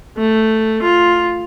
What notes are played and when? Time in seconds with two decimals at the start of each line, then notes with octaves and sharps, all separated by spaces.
0.17 A3
0.82 F4